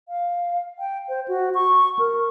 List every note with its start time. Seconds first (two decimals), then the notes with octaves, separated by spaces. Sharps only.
0.09 F5
0.79 G5
1.09 C5
1.28 F#4
1.55 C#6
1.99 A#4